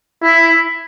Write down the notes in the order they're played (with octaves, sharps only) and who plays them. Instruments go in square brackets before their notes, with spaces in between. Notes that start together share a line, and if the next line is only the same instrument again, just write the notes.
[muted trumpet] E4